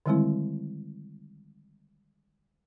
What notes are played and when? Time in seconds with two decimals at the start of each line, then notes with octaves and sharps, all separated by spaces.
0.06 D3 D#3 G3 G#3 C4 E4